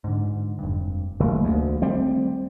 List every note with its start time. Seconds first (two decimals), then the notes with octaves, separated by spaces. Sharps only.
0.04 G#2 D3
0.59 F1 G2
1.20 F#1 D#3 A3 A#3
1.44 D2
1.82 G3 C4